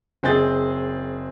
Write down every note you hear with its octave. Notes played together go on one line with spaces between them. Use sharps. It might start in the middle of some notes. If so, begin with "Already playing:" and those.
F#1 C4 G#4 D#5 G6 A6